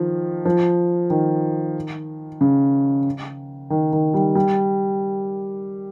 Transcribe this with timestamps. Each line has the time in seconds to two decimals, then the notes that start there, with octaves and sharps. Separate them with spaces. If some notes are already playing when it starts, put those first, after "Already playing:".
Already playing: D#3 F3
0.45 F3
1.10 D#3
2.41 C#3
3.70 D#3
3.93 D#3
4.14 G3
4.35 G3